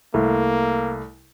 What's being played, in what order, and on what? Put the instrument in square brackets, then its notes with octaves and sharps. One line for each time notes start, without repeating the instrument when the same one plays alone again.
[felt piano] C2 [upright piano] A3 [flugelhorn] A#3